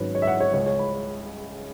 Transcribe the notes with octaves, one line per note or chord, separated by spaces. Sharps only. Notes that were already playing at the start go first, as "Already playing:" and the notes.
Already playing: G#1 G#2 F#3 C#4 B4
C#5
E5
F#5
C#5
C#2 C#3 G#3 C#5
C#5
B5
C#5